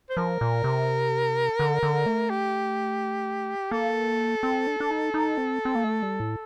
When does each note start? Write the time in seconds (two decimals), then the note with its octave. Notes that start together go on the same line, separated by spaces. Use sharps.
0.10 C5
0.17 F3 A#4
0.41 A#2
0.64 C3
1.59 D3
1.83 D3
2.06 A3
2.30 G4
3.71 A#3 A4
4.43 C4
4.67 D4
4.80 D4
4.91 D#4
5.14 D#4
5.38 C4
5.65 C4
5.75 A#3
5.84 A3
6.02 G3
6.20 A2